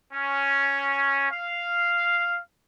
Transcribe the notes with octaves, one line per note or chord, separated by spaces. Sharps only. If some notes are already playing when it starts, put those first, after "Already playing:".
C#4
F5